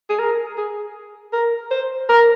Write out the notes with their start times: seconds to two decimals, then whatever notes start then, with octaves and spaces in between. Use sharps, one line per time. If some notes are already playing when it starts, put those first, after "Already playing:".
0.10 G#4
0.19 A#4
0.57 G#4
1.33 A#4
1.71 C5
2.09 A#4